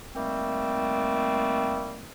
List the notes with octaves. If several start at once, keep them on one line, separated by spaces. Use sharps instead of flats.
D#3 G3 A3 A#3 C4